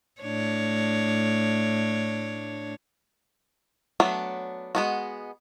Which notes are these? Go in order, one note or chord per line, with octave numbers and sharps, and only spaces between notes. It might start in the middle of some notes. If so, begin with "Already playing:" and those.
A2 D4 C#5
F#3 A3 B3 D4
G#3 B3 F#4